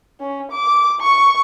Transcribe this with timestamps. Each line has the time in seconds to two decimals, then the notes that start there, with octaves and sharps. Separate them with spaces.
0.20 C#4
0.52 D6
1.00 C#6